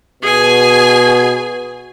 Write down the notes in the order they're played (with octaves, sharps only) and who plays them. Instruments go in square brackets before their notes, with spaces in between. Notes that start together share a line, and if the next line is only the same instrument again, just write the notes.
[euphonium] B2 [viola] G#4 G#5